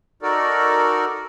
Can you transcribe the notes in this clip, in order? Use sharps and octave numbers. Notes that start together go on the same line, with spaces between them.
D#4 F#4 A4 A#4 D5